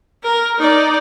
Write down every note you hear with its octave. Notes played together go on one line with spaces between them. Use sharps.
A#4
D#4 D5